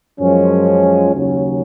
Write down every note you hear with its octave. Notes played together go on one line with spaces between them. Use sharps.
F#2 F3 G#3 C#4
D#2 C#3 F#3 C#4